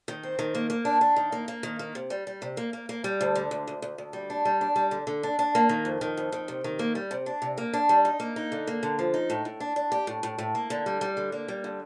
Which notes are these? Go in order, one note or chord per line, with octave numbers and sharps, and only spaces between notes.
D#3
C4
D#3
A#3
A#3
D4
D4
D#3
A#3
A#3
D#3
A#3
C3
G3
G3
C3
A#3
A#3
A#3
G3
D2
D3
D2
D2
D2
D2
G3
D4
G3
D4
G3
D3
D3
D4
D4
A#3
D#3
F2
D#3
F2
D#3
C3
D#3
A#3
G3
C3
D4
C3
A#3
D4
G3
D#4
A#3
D#4
D3
A#3
D3
F3
D#4
A2
A2
D4
D4
G4
A2
A2
A2
A#3
D3
G3
G3
D3
A#3
G3
D3